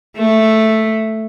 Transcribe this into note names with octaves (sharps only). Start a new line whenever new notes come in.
A3